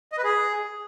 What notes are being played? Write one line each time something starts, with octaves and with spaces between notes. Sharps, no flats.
D#5
B4
G#4